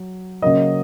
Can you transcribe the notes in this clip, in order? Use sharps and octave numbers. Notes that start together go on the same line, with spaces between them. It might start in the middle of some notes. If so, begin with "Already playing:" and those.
Already playing: F#3
C#3 F#3 A#3 D#5